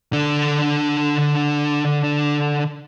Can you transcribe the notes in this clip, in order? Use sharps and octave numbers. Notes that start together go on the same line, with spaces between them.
D3 D4